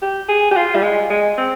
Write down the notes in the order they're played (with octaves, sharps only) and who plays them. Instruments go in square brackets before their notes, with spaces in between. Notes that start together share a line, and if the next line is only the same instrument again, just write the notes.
[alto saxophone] G4
G#4
G4
F4
G3
G#3
G#3
C4